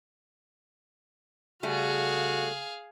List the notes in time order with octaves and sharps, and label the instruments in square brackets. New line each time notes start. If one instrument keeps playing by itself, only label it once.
[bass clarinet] C#3 [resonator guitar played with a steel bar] G3 A3 [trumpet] F#4 [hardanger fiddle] G#4 F5